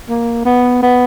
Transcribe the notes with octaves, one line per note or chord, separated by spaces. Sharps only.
A#3
B3
B3